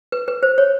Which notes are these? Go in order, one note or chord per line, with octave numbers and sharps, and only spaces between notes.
B4
B4
C5
C#5